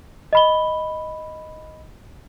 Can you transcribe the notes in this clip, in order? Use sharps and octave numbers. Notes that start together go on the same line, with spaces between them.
D#5 B5 G7